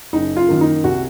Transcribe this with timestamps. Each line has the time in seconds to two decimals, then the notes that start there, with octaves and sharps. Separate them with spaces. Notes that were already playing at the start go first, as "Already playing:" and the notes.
0.13 F#1 D#4
0.37 F4
0.48 F#2 D#3 A#3
0.61 D#4
0.84 C2 F#4